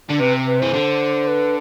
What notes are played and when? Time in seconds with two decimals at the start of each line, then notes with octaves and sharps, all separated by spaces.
0.09 D3
0.19 C3 B4
0.47 B4
0.60 E3 C5
0.73 D3
1.28 B4